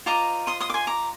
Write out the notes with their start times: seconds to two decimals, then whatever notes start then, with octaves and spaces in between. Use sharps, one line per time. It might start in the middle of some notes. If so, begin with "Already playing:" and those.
0.06 F4 C5 D#5 A#5 D6
0.47 C6 D#6
0.60 C6 D#6
0.70 D6
0.74 G#5 C6
0.87 A#5 D6